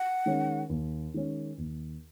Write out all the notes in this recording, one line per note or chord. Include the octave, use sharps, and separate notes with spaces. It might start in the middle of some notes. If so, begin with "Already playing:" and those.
Already playing: F#5
D#3 G#3 C#4
D#2
D#3 G#3 C#4
D#2